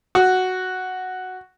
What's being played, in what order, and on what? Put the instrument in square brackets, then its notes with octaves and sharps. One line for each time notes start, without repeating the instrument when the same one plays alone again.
[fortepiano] F#4